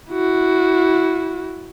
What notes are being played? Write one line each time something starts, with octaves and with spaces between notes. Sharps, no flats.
E4 F#4